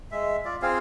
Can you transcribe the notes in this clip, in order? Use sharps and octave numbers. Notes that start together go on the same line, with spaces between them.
G#3 E5
F4 D5
C4 F4 G#4 F5